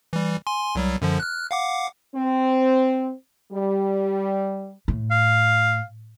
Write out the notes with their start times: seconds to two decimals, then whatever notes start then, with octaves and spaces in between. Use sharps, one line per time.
0.13 E3 G3
0.47 G#5 C6
0.75 C2 F#3 G3
1.02 F#2 D3 F3
1.20 F6 F#6
1.51 F5 F#5 D6
2.16 C4
3.52 G3
4.88 A2
5.11 F5